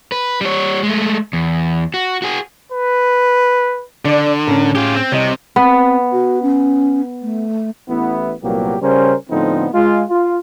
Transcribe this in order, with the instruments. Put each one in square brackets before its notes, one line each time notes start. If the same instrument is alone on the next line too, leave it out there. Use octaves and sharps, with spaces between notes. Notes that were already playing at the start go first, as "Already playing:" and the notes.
[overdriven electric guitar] B4
G3 C#5
G#3 A3
E2
F#4
F#4 G#4
[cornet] B4
[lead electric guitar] D3 [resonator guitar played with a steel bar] D4 D5
[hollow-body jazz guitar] A2 C#4 [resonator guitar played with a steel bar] A#4
[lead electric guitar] F4 G4 [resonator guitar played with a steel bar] G#4
[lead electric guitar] C4
[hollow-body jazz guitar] C2 D#5 [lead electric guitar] C3 [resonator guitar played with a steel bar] C#5
[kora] B3 [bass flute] C4
[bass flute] F#4
C#4
A3
[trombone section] A1 B3 E4
C2 A#2 F#3 A#3 B3 G4
C#3 G3 C#4 A#4 C5
A2 D3 F3 B3 C4 D#4
G#3 F4
F4